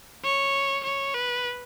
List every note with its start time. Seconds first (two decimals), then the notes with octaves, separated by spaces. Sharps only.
0.24 C#5
0.84 C#5
1.14 B4